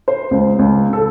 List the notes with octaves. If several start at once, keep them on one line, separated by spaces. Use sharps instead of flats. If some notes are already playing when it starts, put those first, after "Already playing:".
C5
C#2
C#2
A4